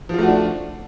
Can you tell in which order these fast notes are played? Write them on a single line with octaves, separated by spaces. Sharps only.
F3 F4 A3 F#4 D4